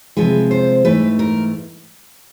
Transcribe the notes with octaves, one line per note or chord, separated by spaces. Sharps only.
C3 F3 G#3 B4
C5
G#2 E3 A3 B4
A#4